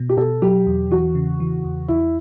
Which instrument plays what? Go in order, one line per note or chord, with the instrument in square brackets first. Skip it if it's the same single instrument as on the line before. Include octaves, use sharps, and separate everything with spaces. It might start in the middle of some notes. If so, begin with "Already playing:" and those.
Already playing: [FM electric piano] B2
[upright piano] G4
[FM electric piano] B2 [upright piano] A4
[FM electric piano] F#3 [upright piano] G4
[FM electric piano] E2
[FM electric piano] E3 [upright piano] F#4
[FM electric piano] C#3
E3
E2
[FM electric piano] E2 [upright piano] E4